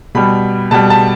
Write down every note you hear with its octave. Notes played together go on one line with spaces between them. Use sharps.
B2 G3 B5
B2 G3 A5
A5